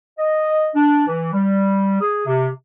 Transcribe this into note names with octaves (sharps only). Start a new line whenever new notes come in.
D#5
D4
E3
G3
G#4
C3